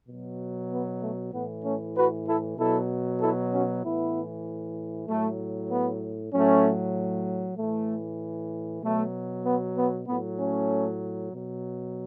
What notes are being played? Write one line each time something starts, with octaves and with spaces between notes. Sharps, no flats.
B2 F#3
B3
A3
A2 E3 B3
A3 C#4
F#4 B4
E4 A4
B2 F#3 E4 A4
E4 A4
C#4 F#4
A2 E3 B3 E4
A2 F#3 A3
B3
A2 F#3 A3 C#4
A2 E3 A3
B2 F#3 A3
B3
B3
A2 F#3 B3
A3 C#4
B2 F#3